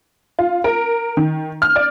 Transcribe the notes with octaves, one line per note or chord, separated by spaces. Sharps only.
F4
A#4
D#3
F6
D5